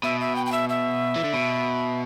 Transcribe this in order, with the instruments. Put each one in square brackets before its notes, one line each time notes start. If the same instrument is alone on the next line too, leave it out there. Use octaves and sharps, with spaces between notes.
[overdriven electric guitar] B2 [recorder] E5
[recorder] E5
G5
G5
E5
E5
[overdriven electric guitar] E3
D3
B2